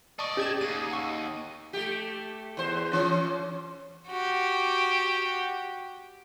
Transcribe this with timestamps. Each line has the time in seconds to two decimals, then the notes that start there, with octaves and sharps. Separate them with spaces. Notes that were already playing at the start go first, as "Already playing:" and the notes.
0.19 D5 D#5 A5 C#6
0.37 C#4 G4 G#4 G#6 E7
0.61 D#2 D#7
0.91 F#5 C#6 E6
1.73 A3 G4
2.57 E2 C5
2.93 E3 C#4
4.07 F#4 G4